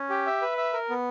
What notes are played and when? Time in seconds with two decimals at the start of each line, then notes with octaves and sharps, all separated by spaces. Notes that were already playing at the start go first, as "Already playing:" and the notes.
Already playing: C#4
0.10 G4
0.26 E5
0.42 B4
0.58 E5
0.73 A#4
0.90 B3